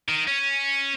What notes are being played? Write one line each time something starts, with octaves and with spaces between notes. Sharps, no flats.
D#3
C#4